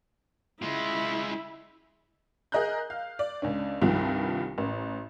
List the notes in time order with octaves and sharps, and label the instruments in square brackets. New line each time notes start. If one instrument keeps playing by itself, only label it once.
[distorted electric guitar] G#3 F4 [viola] E4
[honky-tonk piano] G#4 A#4 D#5 A#5 F#6 G6
F5
D5
C#2 C#4 D4
C2 G2 D#3 F3 C4
A1